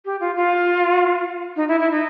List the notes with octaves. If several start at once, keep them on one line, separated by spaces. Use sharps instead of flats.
G4
F4
F4
D#4
E4
E4
D#4